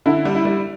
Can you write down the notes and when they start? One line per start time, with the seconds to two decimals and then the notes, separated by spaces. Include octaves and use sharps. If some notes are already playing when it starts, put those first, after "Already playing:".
0.06 D3 E4
0.25 G3
0.35 E4
0.45 G3